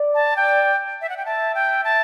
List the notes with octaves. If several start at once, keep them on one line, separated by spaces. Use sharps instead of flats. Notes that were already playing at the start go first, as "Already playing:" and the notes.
Already playing: D5
A5
G5
E5
F#5
G5
E5 A5
G5
A5